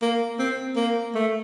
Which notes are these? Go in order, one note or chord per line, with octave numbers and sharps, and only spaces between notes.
A#3
C4
A#3
A3